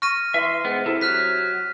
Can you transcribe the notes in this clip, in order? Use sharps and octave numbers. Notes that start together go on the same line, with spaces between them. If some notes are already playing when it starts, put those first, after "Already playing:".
C#6 F6 A#6 D#7
E3 E5 C6
G#2 B3
C3 E4 A4
F#3 F6 F#6 B6